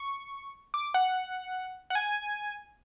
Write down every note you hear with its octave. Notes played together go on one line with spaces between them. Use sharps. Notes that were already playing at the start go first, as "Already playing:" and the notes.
Already playing: C#6
D6
F#5
F#5
G#5